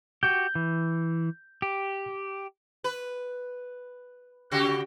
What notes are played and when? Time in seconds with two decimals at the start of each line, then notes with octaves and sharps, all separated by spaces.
0.23 F#4 G4 G6
0.55 E3
1.62 G4
2.84 B4
4.51 C#3 F#4 G4